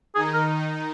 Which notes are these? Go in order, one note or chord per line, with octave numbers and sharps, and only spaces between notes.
D#3 D#4 G#4
A#4